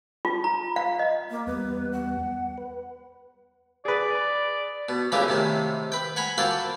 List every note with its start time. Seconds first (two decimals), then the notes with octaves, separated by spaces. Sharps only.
0.25 F4
0.44 A#5
0.76 F5
0.99 D#5
1.30 A#3
1.47 E2 G3 B3 B4
1.93 F#5
2.58 B4
3.85 G#4 B4 D5
4.89 B2
5.12 A#2 C#3 E3 G#3 G4 A#4
5.29 A2 C3 D#3
5.92 B4 G5
6.16 F#5 G#5 A#5 B5
6.38 A#3 F4 F#4 A4 C5 G5